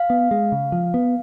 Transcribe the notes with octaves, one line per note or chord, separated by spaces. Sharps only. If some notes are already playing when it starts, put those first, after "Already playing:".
Already playing: F5
B3
G#3
C#3
F3
B3